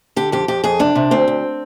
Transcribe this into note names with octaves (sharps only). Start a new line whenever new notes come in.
D3 G4
F2 G4
F2 G4
F2 G#4
C3 D4
C3
D2 C4
D2